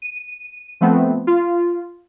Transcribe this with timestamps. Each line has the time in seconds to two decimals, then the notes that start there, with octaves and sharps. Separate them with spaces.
0.02 D#7
0.81 F3 A3 B3 C4
1.27 F4